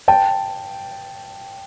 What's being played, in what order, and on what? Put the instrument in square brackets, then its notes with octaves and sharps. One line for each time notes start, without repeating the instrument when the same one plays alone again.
[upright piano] G5 A5